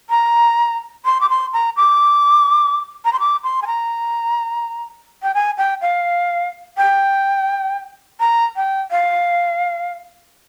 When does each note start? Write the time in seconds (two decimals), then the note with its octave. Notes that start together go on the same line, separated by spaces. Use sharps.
0.10 A#5
1.05 C6
1.21 D6
1.30 C6
1.53 A#5
1.76 D6
3.05 A#5
3.13 C6
3.20 D6
3.43 C6
3.62 G#5
3.67 A#5
5.23 G5
5.34 G#5
5.58 G5
5.81 F5
6.77 G5
8.20 A#5
8.56 G5
8.91 F5